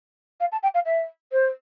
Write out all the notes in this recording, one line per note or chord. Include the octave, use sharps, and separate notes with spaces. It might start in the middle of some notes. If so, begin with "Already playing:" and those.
F5
A5
G5
F5
E5
C5